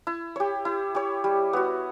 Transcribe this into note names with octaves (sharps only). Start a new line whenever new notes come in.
E4
G4 C#5
E4
G4 C#5
G3
B3 F#4